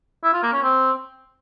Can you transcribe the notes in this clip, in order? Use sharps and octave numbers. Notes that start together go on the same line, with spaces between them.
E4
F4
A#3
C#4
C4